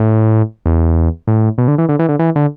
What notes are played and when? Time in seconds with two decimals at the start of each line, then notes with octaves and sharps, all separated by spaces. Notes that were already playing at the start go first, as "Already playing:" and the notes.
Already playing: A2
0.66 E2
1.28 A2
1.58 B2
1.68 D3
1.78 E3
1.89 D3
1.99 E3
2.09 D3
2.19 E3
2.36 D3